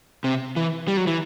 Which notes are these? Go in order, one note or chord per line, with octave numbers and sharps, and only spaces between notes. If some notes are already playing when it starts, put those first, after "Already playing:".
C3
E3
G3
F#3
E3